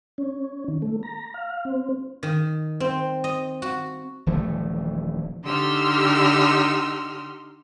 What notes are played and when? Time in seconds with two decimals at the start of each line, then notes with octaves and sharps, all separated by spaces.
0.18 C#4
0.68 D#3
0.82 A3
1.03 A#5
1.34 F5
1.65 C4
2.23 D#3
2.80 C4
3.24 D#5
3.62 F#4
4.27 D#1 E3 F3 A3
5.43 D3 D#4 G4 C6 E6 F6